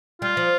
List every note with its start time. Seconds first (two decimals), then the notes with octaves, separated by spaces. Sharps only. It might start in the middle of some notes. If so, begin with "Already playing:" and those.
0.22 G3 F4
0.37 F3